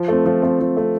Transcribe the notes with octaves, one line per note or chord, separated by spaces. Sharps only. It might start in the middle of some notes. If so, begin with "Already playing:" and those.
Already playing: F3
A3 C4
F3
A3 C4
F3
A3 C4